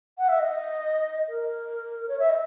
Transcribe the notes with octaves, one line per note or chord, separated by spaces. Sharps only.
F#5
E5
D#5
A#4
C#5
E5
D#5